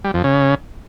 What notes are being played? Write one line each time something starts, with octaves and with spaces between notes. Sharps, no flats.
G3
F2
C#3